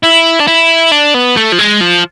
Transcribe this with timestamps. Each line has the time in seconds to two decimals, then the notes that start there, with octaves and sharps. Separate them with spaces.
0.04 E4
0.40 D4
0.48 E4
0.92 D4
1.14 B3
1.37 A3
1.52 F3
1.59 G#3
1.81 F3